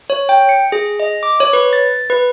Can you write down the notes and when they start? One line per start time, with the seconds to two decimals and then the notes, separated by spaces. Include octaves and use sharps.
0.10 C#5
0.29 G5
0.49 C#7
0.72 G#4
1.00 D#5
1.23 D6
1.40 C#5
1.53 B4
1.73 A6
2.10 B4